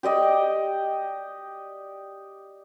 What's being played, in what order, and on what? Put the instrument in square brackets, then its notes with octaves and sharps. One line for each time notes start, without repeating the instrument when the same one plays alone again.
[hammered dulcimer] G4 D5 D#5 G5